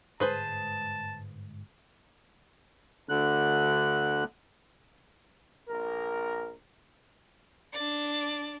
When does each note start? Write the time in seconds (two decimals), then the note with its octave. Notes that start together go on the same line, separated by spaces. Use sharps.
0.20 G1 G#2 G#3 G#4 B4 C5 A5
3.09 D2 D3 F#6
5.69 A#1 A#4
7.73 D4 D5